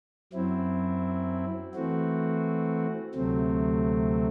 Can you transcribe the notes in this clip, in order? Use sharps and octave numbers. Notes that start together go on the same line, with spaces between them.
F#2 F#3 C4 E4
E3 A3 C4 F#4
D2 C3 F#3 A3 C4